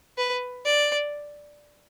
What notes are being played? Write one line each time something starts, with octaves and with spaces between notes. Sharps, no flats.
B4
D5